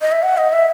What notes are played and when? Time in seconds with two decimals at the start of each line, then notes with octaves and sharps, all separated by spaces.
0.02 D#5
0.12 E5
0.23 F#5
0.37 D#5
0.52 E5